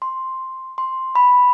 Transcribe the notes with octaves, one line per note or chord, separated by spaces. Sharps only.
C6
C6
B5